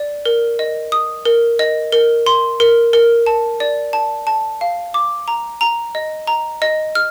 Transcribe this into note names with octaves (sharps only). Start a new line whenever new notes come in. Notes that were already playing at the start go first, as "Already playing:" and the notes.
Already playing: D5
A#4
D#5
D#6
A#4
D#5
A#4
C6
A#4
A#4
A5
D5
A5
A5
F5
D6
A#5
A#5
D#5
A#5
D#5
F6